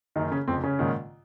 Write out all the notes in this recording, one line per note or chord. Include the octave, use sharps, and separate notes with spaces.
F#1 F#2 D#3 D#4
C#3 C#4
F1 F2 C#3 C4
C#3 C#4
A#1 G#2 D#3